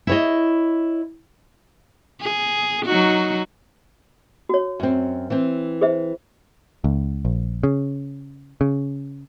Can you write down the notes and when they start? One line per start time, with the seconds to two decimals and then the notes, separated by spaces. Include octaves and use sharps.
0.07 E4 C#5 D#5
2.21 G#4
2.85 F#3 D#4 F#4
4.49 F#4 C#5
4.80 F#2 C4
5.30 E3 C4
5.81 G#4 C5 E5
6.84 C#2
7.25 A#1
7.63 C#3
8.61 C#3